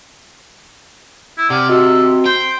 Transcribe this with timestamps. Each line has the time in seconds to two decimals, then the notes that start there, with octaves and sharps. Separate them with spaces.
1.37 E4
1.50 C3 D5 F#5 F6
1.69 F#4 A4 D#5
2.25 C5 G5